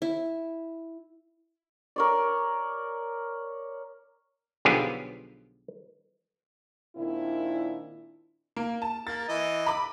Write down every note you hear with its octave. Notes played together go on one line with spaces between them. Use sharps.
E4
A#4 C#5 D5
B1 D3 F3 B3 G4 G#4
A#2 D#3 C4 D4 E4
A#3
A5
A#3 A6
E3 D#5
B5 D6